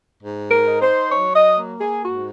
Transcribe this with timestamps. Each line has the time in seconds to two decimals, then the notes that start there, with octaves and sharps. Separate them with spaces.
0.21 G#2
0.50 A#4
0.66 D#4
0.82 C5
1.12 F#3 C#5
1.36 D#5
1.58 A#3
1.80 G#4
2.04 G#2 F#4